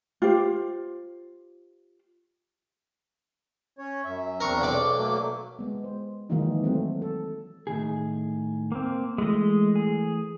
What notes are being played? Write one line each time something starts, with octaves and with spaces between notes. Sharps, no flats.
F4 G4 C5
C#4 C#5
F#2 E5
E2 C4 D4 A#4 C#6
B1 D5
F#3 A3 A#3
G#3 B3
C5
D#3 E3 F#3 G#3 A#3 D#4
F#3 A3 C4
A4
A2 D#3 G#4
A#3 C4
E3 G#3 A3 D#5
G#4